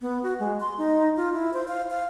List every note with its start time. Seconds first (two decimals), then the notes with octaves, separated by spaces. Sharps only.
0.01 B3
0.23 F#4
0.39 G#3
0.60 C6
0.78 D#4
1.17 F4
1.34 E4
1.53 C5
1.68 F5
1.90 F5